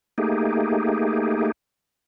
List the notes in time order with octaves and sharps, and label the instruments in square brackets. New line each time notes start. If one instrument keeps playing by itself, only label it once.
[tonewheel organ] A3 A#3 D#4 G4 G#4